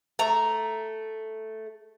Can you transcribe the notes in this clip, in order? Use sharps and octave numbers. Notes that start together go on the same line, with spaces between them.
A3 A#5